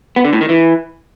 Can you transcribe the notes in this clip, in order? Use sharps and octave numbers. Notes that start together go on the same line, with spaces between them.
B3
D3
A2
D#3
E3